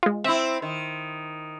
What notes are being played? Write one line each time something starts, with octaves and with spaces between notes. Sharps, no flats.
G#3 F4
C4 E4 E5
D#3